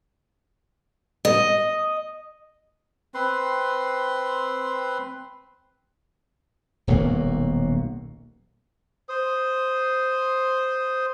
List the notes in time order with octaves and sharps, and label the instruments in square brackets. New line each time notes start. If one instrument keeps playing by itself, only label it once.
[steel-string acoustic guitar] D#5
[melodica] C4 B4 C6
[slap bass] D#1 B1 B2 A#3
[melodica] C5 D#6